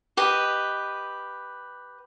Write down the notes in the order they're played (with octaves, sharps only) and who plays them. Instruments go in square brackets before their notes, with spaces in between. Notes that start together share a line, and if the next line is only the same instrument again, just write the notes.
[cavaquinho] G4 B4 D#5